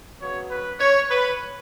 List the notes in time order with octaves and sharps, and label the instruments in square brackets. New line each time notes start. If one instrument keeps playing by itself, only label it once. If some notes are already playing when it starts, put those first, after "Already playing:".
[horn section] C#3 F#3 B3 C#5
B4
C#5
B4